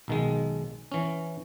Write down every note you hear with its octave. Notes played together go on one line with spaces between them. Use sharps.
B1 D#3 G#3
E3 C#4